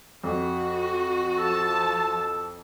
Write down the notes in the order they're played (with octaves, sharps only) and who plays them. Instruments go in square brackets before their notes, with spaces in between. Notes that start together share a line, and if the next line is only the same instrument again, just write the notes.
[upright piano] F2 [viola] F#4
[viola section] F3 A5 [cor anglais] A4